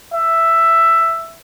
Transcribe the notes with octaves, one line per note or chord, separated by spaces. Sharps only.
E5